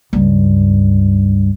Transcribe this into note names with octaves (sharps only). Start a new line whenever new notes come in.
C#2 G2